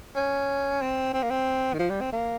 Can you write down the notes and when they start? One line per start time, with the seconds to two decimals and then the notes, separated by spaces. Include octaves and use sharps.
0.16 C#4
0.82 C4
1.14 C4
1.23 A#3
1.30 C4
1.74 D#3
1.79 F3
1.90 G3
2.01 C4
2.13 A#3